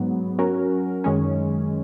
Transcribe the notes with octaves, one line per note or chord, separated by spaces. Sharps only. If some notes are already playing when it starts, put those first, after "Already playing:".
Already playing: G#2 F#3 B3
F#3 C#4 F#4 A#4
F#2 D#3 G#3 C#4